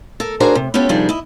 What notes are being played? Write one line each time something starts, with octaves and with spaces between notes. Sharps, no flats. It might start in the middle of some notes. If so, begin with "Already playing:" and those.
A4 A#4
D4 F#4 G#4 A#4 C5 D5
C3
B3 C#4 E4 F4 G4 A4
C3 D#3 F3 G3 D4 G#4
E4 D#5